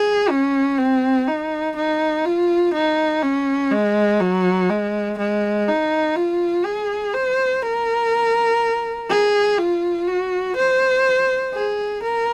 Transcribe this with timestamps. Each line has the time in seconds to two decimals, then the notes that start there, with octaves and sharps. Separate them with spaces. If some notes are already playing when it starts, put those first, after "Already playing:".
Already playing: G#4
0.30 C#4
0.78 C4
1.27 D#4
1.76 D#4
2.25 F4
2.74 D#4
3.23 C#4
3.71 G#3
4.20 F#3
4.69 G#3
5.19 G#3
5.68 D#4
6.16 F4
6.65 G#4
7.14 C5
7.63 A#4
9.10 G#4
9.58 F4
10.08 F#4
10.56 C5
11.54 G#4
12.03 A#4